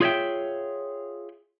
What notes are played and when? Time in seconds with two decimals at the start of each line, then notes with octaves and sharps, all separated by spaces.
0.01 F4 G#4 C#5 D5 E5 G5